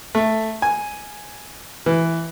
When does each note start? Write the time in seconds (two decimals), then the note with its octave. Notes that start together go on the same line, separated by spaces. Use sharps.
0.15 A3
0.62 G#5
1.86 E3